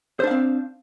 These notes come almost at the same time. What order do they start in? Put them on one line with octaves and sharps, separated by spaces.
C5 D4 F5 C4